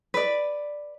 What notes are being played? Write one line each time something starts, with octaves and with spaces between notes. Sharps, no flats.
B4 D5